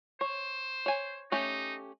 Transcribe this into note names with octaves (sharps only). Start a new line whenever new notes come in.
C5 C#5
C#5 G#5
A3 C#4 D#4 G4